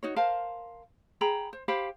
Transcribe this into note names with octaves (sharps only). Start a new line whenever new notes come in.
D#4 F#4 C#5
A#4 C5 F5 A5
G#4 G5 A#5 B5
C5
G4 C5 F5 B5